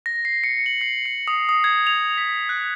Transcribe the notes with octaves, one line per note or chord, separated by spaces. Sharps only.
A#6
C7
C#7
F#7
C7
C#7
D#6
D#6
G#6
F7
B6
F#6